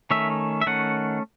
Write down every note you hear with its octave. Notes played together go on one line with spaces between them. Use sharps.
D#3 A3 C#4 E5
E5
D#3 A3 C#4 F#5